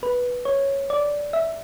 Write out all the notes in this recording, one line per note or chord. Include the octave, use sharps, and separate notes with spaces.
B4
C#5
D5
E5